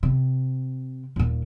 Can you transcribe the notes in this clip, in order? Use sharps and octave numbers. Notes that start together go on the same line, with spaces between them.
C3
D#1 A#2